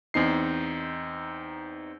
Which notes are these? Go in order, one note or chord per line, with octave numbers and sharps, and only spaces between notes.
E2 C4 D#4 C7